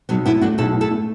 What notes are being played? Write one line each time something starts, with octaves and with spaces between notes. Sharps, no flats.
B1 F#3 B3
A2 B3 E4
A3 D4 F#4
B1 E4 A4
A2
E4 A4
A3